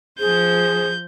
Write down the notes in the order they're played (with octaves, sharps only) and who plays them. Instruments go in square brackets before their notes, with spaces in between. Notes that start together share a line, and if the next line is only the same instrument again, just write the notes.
[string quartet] F3 C5 [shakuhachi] G#4 [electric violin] G6